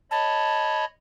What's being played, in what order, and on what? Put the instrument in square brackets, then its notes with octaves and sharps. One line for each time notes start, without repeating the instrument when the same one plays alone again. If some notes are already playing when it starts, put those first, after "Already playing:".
[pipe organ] C#5 D#5 B5 [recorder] A5